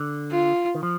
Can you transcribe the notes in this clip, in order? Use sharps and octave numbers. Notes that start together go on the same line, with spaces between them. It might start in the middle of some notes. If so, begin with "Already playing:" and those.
Already playing: D3
F4
D#3
F3